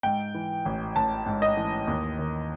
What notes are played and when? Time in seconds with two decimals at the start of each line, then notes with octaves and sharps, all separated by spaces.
0.03 G#2 G5
0.34 E3
0.65 A1
0.96 A1 A5
1.26 G#2
1.42 D#5
1.57 E3
1.87 D#2
2.19 D#3